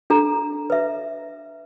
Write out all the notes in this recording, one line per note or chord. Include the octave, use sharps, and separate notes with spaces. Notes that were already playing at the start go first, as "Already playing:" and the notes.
D4 A4 A#5
B4 E5